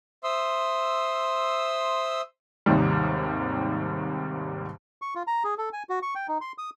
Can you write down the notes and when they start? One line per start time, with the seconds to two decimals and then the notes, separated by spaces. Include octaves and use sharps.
0.24 C5 E5 C6 D#6 E6
2.66 D#2 G#2 C3 D#3 G3
5.02 C#6
5.15 F4
5.27 A#5
5.44 G#4
5.58 A4
5.73 G#5
5.89 F#4
6.02 C#6
6.15 G5
6.28 D#4
6.41 C6
6.58 D#6